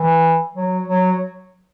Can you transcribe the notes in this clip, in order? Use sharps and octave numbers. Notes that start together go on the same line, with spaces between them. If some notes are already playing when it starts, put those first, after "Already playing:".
Already playing: E3
F#3
F#3